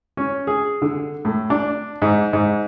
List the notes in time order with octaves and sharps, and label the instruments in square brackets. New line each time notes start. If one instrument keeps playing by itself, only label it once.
[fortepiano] C#4
G#4
D3
A2
D4
G#2
G#2